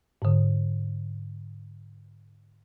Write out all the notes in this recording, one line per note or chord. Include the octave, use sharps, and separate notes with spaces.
G#2 D3